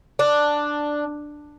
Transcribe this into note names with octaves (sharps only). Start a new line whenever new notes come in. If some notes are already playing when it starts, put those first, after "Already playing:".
D4